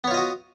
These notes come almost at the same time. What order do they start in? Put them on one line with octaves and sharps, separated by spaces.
B3 C#5 F4 D#5 F#4